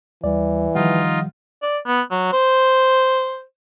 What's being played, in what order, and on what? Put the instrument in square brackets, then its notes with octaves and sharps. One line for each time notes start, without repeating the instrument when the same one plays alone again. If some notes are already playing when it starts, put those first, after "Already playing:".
[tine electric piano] D#2 G3 [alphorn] E3 [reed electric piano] D5
[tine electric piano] D#3 F#5 [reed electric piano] F3 G3 [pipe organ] D#4 F4
[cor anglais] D5
B3
F#3
C5